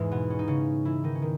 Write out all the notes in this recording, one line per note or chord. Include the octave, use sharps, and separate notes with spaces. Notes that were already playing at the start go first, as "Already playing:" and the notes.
Already playing: E2 G#2 E3 G#3
B2 B3
C#4
D#4
C#3 C#4
E3 E4
D#3 D#4
C#4
D#3